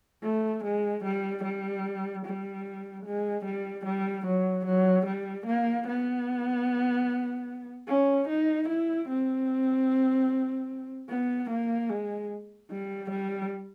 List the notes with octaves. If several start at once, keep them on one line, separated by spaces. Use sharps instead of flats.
A3
G#3
G3
G3
G3
G#3
G3
G3
F#3
F#3
G3
A#3
B3
C#4
D#4
E4
C4
B3
A#3
G#3
G3
G3